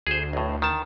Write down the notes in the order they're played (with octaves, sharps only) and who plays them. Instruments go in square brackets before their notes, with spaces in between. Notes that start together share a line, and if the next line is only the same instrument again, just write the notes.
[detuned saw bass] D2 [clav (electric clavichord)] G#4 C5
[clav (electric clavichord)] B1 A2
D#3 A5